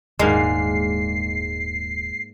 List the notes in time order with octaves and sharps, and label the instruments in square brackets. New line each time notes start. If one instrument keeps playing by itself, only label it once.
[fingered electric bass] D#1 [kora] G#2 A#3 D4 [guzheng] G#3 [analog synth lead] C7